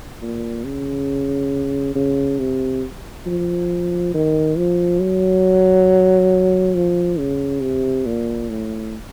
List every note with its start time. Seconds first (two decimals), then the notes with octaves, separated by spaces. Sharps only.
0.22 A#2
0.65 C#3
1.95 C#3
2.39 C3
3.26 F3
4.14 D#3
4.57 F3
5.00 F#3
6.75 F3
7.19 C#3
7.61 C3
8.06 A#2
8.49 A2